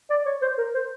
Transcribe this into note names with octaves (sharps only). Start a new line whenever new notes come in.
D5
C#5
C5
A#4
C5